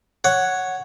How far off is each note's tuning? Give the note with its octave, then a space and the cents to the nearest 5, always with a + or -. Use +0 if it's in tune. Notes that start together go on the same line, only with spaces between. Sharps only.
C#5 +0 F#5 +0